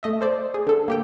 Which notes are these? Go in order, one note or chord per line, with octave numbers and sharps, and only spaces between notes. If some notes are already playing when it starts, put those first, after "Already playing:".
A3 D#5 E5
A4 C5 D5
G#4
D3 A4
A#3 G4 G5